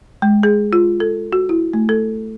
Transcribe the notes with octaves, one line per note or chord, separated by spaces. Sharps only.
G#3
G#4
F4
A4
F#4
E4
A3
A4